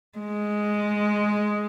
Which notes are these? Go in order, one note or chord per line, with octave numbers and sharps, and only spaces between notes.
G#3